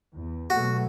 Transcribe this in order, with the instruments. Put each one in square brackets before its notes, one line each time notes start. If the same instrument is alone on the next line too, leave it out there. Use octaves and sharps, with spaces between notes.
[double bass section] E2
[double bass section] B2 F#3 A3 [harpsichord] F#4